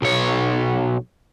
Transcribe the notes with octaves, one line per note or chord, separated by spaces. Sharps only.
B1 C#5